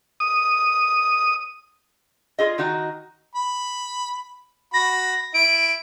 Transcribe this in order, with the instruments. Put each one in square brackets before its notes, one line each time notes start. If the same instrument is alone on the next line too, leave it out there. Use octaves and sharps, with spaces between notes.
[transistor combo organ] D#6
[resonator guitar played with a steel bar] F4 G#4 D#5
D#3 D#4 F#4 D#5 A#5
[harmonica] B5
[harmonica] F#4 B5 [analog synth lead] A#6
[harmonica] E4 [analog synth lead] D7